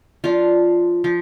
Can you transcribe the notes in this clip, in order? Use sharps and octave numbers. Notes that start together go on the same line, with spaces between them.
F3 D4 F4
F3